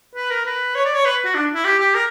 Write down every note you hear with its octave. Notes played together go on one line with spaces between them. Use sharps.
B4
A#4
B4
C#5
D5
C#5
B4
F#4
D4
E4
G4
G4
A#4